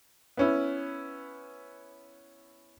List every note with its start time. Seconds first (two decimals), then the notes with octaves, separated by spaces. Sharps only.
0.37 B3 C#4 E4